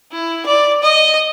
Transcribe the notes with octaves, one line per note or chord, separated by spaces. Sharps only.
E4
D5
D#5